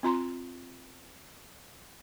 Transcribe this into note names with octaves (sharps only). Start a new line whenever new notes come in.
C4 F4 A#5 C6